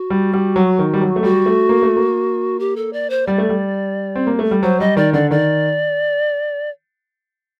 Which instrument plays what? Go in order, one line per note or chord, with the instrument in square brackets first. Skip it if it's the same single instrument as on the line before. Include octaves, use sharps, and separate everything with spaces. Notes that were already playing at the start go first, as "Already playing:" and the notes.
Already playing: [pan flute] F#4
[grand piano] G3
G3
F#3
D#3
G3
F#3
A3
[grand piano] G3 [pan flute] F#4
[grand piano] A3
A#3
A3
A#3
[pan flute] G4
A4
D5
C5
[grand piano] G3 [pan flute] D5
[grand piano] A3
G3
C4
A#3
A3
G3
[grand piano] F#3 [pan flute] C5
[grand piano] G3 [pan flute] D#5
[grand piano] D#3 [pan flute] D5
[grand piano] D3 [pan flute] D5
[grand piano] D#3 [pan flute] D5